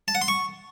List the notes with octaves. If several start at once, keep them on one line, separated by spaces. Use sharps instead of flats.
A5
F#5
C6
C#6